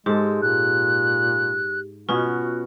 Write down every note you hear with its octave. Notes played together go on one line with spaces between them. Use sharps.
G#2 G#3 G4 A4
A#2 F#6
B2 B3 C#4 F4 F#4